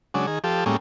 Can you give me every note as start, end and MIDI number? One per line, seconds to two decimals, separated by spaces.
0.14 0.26 49
0.14 0.26 54
0.14 0.26 56
0.14 0.26 62
0.27 0.39 51
0.27 0.39 68
0.44 0.64 53
0.44 0.64 67
0.44 0.64 69
0.66 0.77 45
0.66 0.77 55
0.66 0.77 56
0.66 0.77 58
0.66 0.77 61